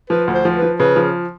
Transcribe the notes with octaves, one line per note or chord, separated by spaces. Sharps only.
F3 B4
D2
C5
F3
B4
F3
C#3 B4
F3